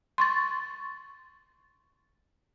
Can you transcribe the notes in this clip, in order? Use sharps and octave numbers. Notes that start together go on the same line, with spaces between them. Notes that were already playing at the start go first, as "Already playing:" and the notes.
C6 C#6 A6